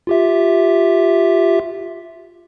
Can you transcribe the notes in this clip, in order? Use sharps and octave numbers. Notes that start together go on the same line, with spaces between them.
F4 G4 E5